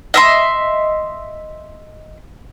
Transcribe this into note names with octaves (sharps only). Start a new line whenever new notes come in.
D#5 E5 C6